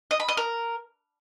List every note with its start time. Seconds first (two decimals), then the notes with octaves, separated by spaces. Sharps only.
0.11 D#5
0.20 B5
0.28 D#5
0.37 A#4